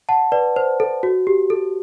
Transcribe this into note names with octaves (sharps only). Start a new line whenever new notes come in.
F#5 A5
B4 D5
C5
A4
F#4
G4
A4